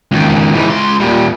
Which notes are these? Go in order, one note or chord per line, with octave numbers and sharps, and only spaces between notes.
C#2 D#3
G#2 E3
C#2 C6
A#2 G3